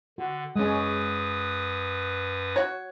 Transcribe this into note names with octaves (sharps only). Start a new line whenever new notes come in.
D3 F#4
F#2 G#3 C#4 B4 D#6
F#4 C#5